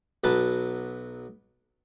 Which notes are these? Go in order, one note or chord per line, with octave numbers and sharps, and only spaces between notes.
B1 F#3 B4 A5